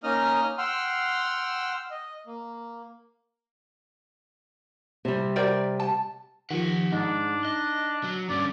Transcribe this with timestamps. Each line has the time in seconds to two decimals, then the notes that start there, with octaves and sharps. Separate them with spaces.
0.04 A#3 C#4 D#4 D#5 D#6 F6
0.58 F#5 G5 C6 E6 F6
1.91 D#5
2.27 A#3
5.05 C3 G3
5.36 A#4 C5 D5
5.80 A5
6.50 D#3 F3 G4 F#5
6.92 G#2 D4 D#4
7.45 D4 D#5
8.04 F#3
8.30 G2 D3 C#4 D5